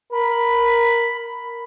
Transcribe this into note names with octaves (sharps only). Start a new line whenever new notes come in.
A#4 B5